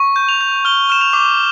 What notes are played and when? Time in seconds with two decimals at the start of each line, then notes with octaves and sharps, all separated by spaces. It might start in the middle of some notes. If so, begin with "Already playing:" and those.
Already playing: C#6
0.16 G6
0.29 F7
0.41 G6
0.65 F6 G7
0.90 F6 E7
1.01 F7
1.13 D6